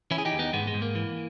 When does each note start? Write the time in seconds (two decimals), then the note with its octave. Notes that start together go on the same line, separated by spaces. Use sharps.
0.11 E3 C#4 E4
0.18 G#4
0.25 D#4 G4
0.32 D#2
0.39 B3 D#4
0.53 G#2 G#3 B3
0.68 G#3
0.74 G#2
0.82 A#3
0.96 E3